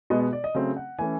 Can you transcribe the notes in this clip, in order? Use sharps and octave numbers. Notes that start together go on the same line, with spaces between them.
B2 G#3 B3 D#5
D#5
D5
D#5
C#3 F#3 A3 C4
F#5
E3 A3 C#4 G#5